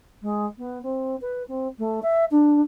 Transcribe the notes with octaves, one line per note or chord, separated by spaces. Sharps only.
G#3
B3
C4
B4
C4
A3
E5
D4